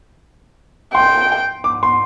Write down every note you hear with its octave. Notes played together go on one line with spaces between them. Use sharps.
G5 C6
D6
C6